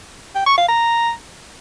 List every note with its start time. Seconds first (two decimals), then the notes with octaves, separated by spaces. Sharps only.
0.35 G5
0.46 C#6
0.57 F5
0.69 A#5